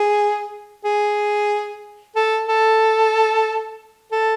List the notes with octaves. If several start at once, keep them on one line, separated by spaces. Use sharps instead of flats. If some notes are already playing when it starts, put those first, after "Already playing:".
Already playing: G#4
G#4
A4
A4
A4